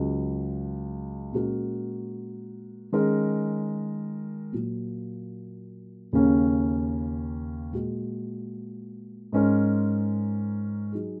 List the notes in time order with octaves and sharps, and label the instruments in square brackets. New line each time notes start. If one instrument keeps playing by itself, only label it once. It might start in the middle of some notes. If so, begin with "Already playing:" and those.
Already playing: [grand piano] C#2 C#3 F#3
A#2 G#3 C#4 F#4 A#4
D#3 G#3 C#4 A#4
A#2 F#3 A#3
D#2 C#3 A#3 C#4
A#2 G#3 F#4
G#2 G#3 C#4 A#4 C#5
F#3 D#4 G#4